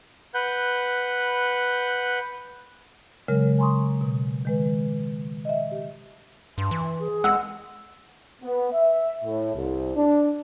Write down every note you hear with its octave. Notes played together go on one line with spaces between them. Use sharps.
B4 F#5 G6
C#3 F#3 G#3 A#4
G#5 A#5 C6 C#6 D#6
B2
D#3 G#3 B4
D#5 E5
G4
G2 C6
E3
G#4
G#3 F#5 E6
B3
E5
A2
C2
D4